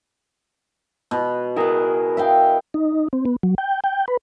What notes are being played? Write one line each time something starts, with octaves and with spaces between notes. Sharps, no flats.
B2
E4 G#4 A#4 F#5
E5 F5 G5
D#4
C4
B3
F#3
G5
G5
B4